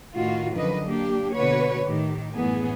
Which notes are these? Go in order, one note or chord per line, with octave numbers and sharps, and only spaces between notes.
A2 D#3 F4 F#4
F#2 D3 D#3 F3 B4 D#5
A#3 D4 G4
B2 D3 F#4 B4 C#5
A2 D#3 G4
F#2 A2 E3 B3 G#4